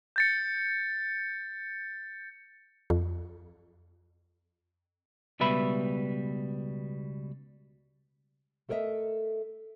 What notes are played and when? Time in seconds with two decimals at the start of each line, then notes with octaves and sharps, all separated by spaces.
0.16 G6 A6 C#7
2.90 F2
5.40 C#2 B2 G3 B4 E5 B5
8.69 A3 A4 A#4 C5 D#5 E5